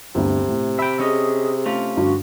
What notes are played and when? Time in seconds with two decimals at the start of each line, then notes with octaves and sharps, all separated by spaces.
0.15 G1 D2 G2 C3
0.48 A2
0.79 E5 G5 B5
1.00 C#4 G#4 D#5
1.66 A3 C#4 F4
1.97 G2 D3 F#4